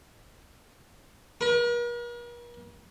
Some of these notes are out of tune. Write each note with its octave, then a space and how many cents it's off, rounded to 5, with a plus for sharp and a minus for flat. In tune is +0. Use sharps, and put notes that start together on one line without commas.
A#4 +45